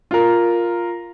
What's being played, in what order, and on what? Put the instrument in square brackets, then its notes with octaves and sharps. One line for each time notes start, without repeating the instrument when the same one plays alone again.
[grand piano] F4 A#4